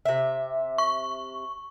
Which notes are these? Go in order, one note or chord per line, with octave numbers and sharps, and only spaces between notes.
C3 E5
C#6